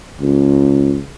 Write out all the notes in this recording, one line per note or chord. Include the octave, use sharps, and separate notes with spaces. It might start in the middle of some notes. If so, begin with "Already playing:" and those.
C#2